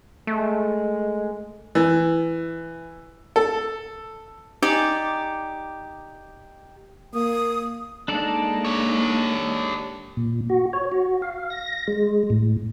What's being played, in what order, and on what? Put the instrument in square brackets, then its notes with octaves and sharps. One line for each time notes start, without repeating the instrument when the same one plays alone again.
[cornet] G#3 [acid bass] A3
[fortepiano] E3
A4
[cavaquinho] D#4 G4 D5 G#5
[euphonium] A#3 [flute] D#6
[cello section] G#3 A#3 D#4 [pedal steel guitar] D4 A4 D5
[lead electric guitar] G4 C#5
[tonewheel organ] A#2
F#4
C#5
F#4
F5
A#6
G#3
A2